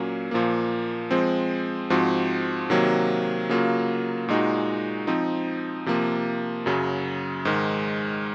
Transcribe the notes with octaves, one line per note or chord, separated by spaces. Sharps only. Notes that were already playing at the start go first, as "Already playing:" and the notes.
Already playing: A#2 F#3 A#3 C#4
A#2 F3 A#3
F3 G#3 C4
G#2 F3 C4 F#4
C3 D#3 F#3 A#3
C#3 F#3 A#3 F4
A#2 G#3 D#4 F#4
F3 C4 D#4
C3 F3 A#3
F#2 C#3 F#3
G#2 D#3 G#3